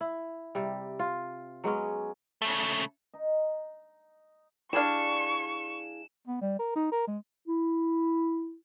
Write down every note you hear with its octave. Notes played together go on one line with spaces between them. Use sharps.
E4
C3 G3
F4
F#3 G#3 B3 C#4
C#3 A3
D#4
G3 D4 E4 G#4 F5 C#6 E7
B3
G3
A#4
D#4
A#4
G#3
E4